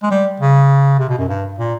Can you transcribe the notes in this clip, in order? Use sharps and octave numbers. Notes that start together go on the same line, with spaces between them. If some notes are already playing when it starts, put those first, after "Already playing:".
G#3
G3
C#3
C3
B2
F#2
G2
A#2